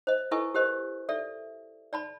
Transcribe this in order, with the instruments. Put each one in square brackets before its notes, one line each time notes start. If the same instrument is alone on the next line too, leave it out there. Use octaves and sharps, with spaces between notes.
[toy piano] C5 D#5
E4 A4 B4 D#5 G#5 C#6
G4 A#4 C5 D#5
A4 D5 E5
D5 A5 B5